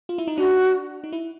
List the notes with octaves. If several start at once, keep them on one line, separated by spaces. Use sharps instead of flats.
F4
E4
D#4
D4 F#4
D#4
E4